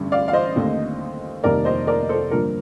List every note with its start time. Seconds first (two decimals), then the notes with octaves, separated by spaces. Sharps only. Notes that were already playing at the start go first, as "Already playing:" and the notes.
Already playing: A1 G2 D3
0.12 D5 F5
0.28 F5
0.33 C5 D#5
0.56 D#2 D3 A3 C4
1.44 F1 D#2 D#3 G3 A#3 A#4 D5
1.65 C5 D#5
1.87 A#4 D5
2.09 A4 C5
2.31 G2 D3 F3 A#3 A#4